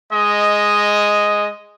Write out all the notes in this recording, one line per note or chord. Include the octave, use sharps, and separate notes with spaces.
G#3 D#5